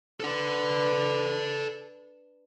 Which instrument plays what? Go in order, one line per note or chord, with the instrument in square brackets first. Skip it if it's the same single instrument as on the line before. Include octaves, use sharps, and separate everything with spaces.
[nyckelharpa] D4 B4 [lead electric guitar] A4 F#5